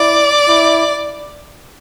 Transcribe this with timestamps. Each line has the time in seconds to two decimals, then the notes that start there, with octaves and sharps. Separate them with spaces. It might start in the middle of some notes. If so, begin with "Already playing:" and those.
Already playing: E4 D5
0.48 E4